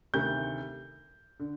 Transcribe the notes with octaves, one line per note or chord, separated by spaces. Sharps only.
D2 C3 D#3 G6
D3